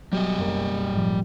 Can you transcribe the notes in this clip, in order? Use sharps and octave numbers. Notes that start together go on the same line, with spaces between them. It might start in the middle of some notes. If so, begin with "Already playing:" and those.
B2 F#3 G3 G4 D#5
F#1 A#4
A2 F3